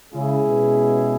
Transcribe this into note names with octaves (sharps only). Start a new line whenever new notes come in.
C#3 G#3 C#4 E4 G#4
B2